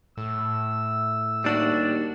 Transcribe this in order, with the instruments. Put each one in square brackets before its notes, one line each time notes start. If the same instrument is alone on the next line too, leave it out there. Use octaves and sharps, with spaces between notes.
[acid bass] A2 [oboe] E6
[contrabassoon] D#2 [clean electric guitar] G3 D4 F#4